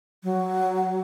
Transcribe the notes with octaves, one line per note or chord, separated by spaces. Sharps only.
F#3